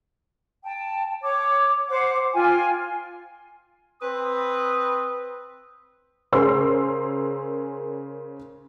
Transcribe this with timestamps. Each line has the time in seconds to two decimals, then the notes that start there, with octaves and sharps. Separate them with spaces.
0.64 G5 A5
1.22 C#5 D6
1.89 C5 F#5 D6
2.33 F4 G5 G#5
4.02 C4 B4 D#6
6.32 C#3 G#4 A#4 C5 C6 E6